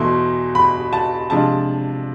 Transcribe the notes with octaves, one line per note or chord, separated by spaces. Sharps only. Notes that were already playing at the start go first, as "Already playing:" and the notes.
Already playing: E2 B2 A3 E4 C6
B5
A5
C3 F3 G#3 D4 F4 A5